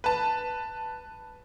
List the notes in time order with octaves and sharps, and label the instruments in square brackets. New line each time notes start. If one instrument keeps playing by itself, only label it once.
[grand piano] B4 A5